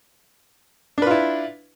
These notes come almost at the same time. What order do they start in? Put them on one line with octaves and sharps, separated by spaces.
D4 B4 F4 E4